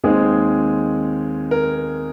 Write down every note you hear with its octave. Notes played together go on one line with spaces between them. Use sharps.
D#2 D#3 G#3 C4 G#4
A#4